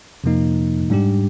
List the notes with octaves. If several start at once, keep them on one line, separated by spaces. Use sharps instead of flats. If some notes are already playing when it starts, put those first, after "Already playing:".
F2 C3 F3 A#3 D#4
G#2 G3 D4 G4